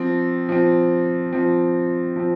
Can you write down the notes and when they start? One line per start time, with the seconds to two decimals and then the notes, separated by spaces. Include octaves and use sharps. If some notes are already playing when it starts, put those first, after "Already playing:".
Already playing: F3 C4
0.49 F3 C4
1.33 F3 C4
2.16 F3 C4